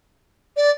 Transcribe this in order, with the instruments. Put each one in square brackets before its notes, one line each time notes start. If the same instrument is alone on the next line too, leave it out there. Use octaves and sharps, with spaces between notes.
[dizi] D5